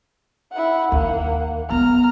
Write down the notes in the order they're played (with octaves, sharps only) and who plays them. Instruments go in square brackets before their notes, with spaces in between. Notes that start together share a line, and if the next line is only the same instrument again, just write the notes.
[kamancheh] E4 F#5
[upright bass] D#2 [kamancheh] A#3 F#5
[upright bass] B3 [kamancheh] A#5 F6